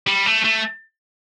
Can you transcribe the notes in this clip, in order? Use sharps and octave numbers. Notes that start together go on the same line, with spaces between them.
G3
A3
A3